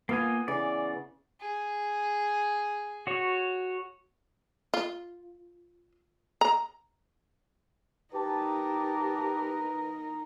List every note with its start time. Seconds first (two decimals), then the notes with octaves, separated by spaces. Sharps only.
0.09 A#3 B3 F4 G#5
0.48 C#3 E3 D5
1.40 G#4
3.07 F#4 C#5
4.74 F4
6.41 A#5
8.14 D#4 G4 A#4 B4 A5